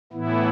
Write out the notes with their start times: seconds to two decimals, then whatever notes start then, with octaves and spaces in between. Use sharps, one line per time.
0.13 A2 E3 B3 E4